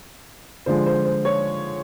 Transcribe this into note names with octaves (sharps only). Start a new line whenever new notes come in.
D3 F3 G#3 C5
C5
C5
C#5